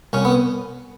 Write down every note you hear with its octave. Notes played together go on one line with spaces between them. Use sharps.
C2 C#4
B3